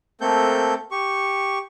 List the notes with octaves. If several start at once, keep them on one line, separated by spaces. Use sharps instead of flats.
A3 A#3 C4 A4 G6
G4 C#6